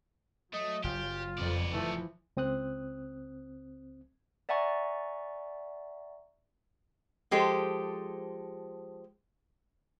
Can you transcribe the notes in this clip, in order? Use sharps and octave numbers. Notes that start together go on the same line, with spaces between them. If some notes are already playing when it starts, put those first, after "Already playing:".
F#3 A3 D#5
F#1 F4 G4
F2 B3 D5
E3 F3 A3
C#2 C4 D#6 F#6
D5 E5 F#5 G#5 A#5 C#6
F3 G#3 G4 A4 C5